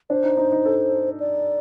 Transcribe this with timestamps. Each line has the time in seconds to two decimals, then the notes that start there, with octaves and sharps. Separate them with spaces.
0.10 D4 C5
0.24 D#4
0.37 D#4
0.52 D#4
0.65 A4
1.20 D5